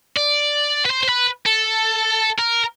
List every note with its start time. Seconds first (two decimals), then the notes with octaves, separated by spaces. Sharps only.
0.16 D5
0.85 B4
0.90 C5
1.03 C5
1.09 B4
1.46 A4
2.38 A#4